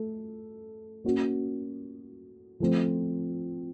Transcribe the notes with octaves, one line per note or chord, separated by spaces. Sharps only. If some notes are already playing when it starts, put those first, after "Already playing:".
Already playing: A3 A4
A#3 C#4 F#4
F3 A3 C4